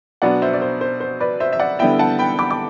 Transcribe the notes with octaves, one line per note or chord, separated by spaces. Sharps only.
B2 F#3 B3 D4 D5 F#5
C5 E5
D5
C5
C5
C5
B4 D5
C5 E5
E5
D5 F#5
D3 G3 B3 E4 E5 G5
F#5 A5
G5 B5
B5 D6
D6